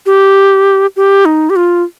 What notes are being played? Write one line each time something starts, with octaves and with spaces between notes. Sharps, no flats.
G4
G4
D#4
G4
F4